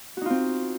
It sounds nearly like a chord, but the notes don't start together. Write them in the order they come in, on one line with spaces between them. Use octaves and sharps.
F#4 D#4 F4 C4